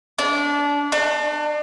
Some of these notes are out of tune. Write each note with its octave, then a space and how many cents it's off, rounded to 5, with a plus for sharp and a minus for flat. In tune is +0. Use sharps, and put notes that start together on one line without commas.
D4 -25
D4 +35